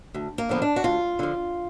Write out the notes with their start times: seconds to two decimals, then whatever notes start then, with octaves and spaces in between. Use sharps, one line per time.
0.14 D2
0.38 A#3
0.49 D3 F3 B3
0.62 D4
0.76 F#4
0.84 D2 F4
1.19 D3 F3